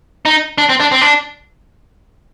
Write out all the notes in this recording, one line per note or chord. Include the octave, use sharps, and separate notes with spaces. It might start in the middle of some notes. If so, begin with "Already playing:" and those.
D#4
D4
C4
D4
C4
D4